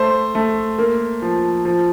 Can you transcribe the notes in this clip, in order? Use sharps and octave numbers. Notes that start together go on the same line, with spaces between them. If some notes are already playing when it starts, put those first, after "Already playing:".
Already playing: A3 C5
A3
A#3
F3
F3